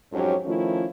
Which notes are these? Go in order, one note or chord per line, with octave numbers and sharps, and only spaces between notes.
F2 G#2 F#3 C#4 G4 C#5
D#3 F3 A3 C#4 E4 F4